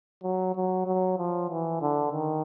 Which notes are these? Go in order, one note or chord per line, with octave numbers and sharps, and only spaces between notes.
F#3
F#3
F#3
F3
E3
D3
D#3